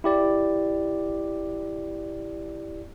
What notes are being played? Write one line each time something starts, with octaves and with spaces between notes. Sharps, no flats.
E4 G4 D5